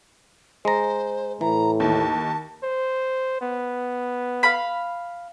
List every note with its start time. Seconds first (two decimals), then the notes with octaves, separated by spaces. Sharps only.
0.65 G#3 C5 A#5
1.41 A2 E3 A#5
1.80 D#2 A5
2.63 C5
3.41 B3
4.43 F5 B5